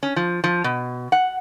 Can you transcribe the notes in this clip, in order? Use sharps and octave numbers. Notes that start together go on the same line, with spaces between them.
C#4
F3
F3
B2
F#5